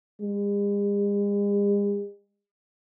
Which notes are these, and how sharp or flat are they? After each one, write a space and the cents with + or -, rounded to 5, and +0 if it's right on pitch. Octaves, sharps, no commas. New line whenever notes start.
G#3 -45